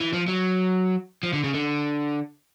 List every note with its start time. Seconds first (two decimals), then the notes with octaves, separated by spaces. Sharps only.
0.01 E3
0.14 F3
0.28 F#3
1.23 F3
1.33 D3
1.44 C#3
1.54 D3